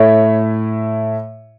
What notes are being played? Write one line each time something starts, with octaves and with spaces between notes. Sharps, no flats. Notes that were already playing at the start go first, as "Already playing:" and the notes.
Already playing: A2 A3 E4 C#5